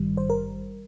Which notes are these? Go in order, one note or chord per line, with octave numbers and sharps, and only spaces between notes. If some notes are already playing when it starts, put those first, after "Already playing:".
Already playing: G#1 G2 D#3 G3
C5
A#4